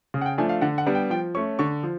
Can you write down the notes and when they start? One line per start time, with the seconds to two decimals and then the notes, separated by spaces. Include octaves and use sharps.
0.14 C#3
0.21 F#5
0.26 G5
0.38 F3 A3 D4 G#5
0.49 F5
0.61 D3 F#5
0.78 F#5
0.86 G3 B3 D4
0.95 G5
1.10 F3 G5
1.35 A3 C#4 C#6
1.59 D3 C#6
1.83 F3